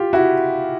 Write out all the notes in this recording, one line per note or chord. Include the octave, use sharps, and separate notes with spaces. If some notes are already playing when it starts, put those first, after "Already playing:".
Already playing: F4 G4
E4 F#4